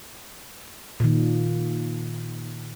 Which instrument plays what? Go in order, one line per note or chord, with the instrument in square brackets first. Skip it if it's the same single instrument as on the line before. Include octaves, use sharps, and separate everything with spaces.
[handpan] A#2 D#3